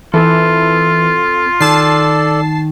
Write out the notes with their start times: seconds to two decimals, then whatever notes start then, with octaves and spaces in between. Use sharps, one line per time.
0.14 E3 C4 F4 A4
1.61 D#3 A4 D5 A5 C7